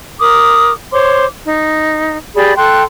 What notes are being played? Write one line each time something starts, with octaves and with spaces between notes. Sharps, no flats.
A#4 D6 D#6
C5 C#5 C6 D6
D#4
G4 G#4 D5 B5
A4 G5 C6 F#6